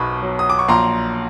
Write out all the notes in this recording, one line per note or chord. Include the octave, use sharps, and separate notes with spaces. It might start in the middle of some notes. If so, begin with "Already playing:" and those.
Already playing: B1 B2 B5 C#6
F#3
D#6
D6
C#6
A#1 A#5 C6